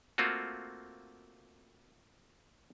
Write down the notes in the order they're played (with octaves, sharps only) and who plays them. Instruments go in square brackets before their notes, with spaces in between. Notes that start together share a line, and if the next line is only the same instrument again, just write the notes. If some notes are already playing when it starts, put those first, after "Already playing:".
[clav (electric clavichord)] A3 A#3 C4 F4 F#4